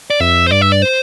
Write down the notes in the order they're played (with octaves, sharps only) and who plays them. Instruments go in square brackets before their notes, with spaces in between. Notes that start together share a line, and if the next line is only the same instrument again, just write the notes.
[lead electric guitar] D5
[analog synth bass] F2 [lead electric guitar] E5
[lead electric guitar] C5
[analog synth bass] G2 [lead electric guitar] D5
[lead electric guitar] E5
D5
C5